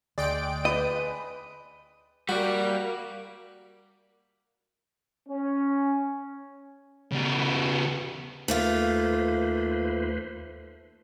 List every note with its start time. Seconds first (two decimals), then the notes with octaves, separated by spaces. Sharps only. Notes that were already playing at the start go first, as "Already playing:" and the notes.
0.18 D2 G#3 D5 G5 D7
0.65 B4 D#5
2.29 G3 A#3 F#4 D5
5.29 C#4
7.12 C#3 B3
8.48 D#2 A3 A#3 F4 B4 C5